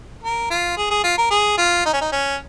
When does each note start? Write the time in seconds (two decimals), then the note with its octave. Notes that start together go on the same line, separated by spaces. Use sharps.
0.23 A#4
0.50 F4
0.77 G#4
0.90 G#4
1.04 F4
1.18 A#4
1.31 G#4
1.58 F4
1.85 D#4
1.94 C#4
2.01 D#4
2.12 C#4